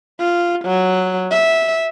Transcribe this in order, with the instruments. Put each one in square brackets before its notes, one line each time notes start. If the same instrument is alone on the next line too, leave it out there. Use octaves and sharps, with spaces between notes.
[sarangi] F4
F#3
E5